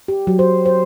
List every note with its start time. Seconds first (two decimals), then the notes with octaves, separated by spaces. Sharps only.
0.08 G4
0.27 F#3
0.39 C5
0.66 C5